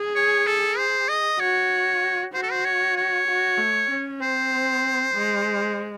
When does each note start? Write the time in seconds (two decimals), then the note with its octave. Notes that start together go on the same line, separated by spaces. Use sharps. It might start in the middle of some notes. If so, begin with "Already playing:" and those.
Already playing: G#4
0.16 C#5
0.47 A4
0.78 C5
1.09 D#5
1.40 F#4 C#5
2.34 F#4 C5
2.43 A4
2.51 C5
2.65 C#5
2.97 C#5
3.28 F#4
3.58 A3
3.90 C#4
4.20 C4 C5
5.15 G#3